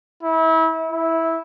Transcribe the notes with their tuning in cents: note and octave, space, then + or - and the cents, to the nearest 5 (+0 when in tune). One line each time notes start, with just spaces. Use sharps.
E4 -30
E4 -10